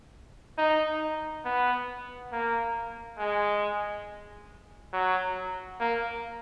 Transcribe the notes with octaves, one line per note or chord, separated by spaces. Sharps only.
D#4
B3
A#3
G#3
F#3
A#3